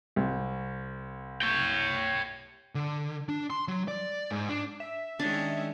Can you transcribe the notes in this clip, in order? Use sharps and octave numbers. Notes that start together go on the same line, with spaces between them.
C2
C#5 G5
D3
D4
C6
F#3
D5
G#2
D4
E5
D#3 G#3 C#4 D4